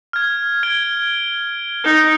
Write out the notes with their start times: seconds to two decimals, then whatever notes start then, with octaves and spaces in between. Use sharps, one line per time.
0.13 F6 G#6
0.63 G#6 D7 G7
1.84 D#4